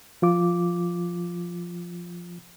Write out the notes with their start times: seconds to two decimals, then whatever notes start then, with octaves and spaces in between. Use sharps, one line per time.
0.22 F3 F4 D6